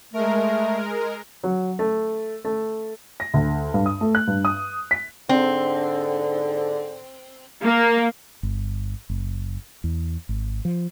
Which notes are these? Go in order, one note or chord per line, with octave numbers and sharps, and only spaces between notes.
G#3 A3 A#4
F#3
A3
A3
A#6
D2
G2
D#6
A3
F#6
G2
D#6
B6
G#2 D3 C4
A#3
G1
F#1
E2
G#1
F3